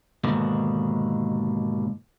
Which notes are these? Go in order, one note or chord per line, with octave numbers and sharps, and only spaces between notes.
D#2 G#2 B2 D3 D#3